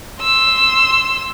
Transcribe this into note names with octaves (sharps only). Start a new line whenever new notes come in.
C6 E6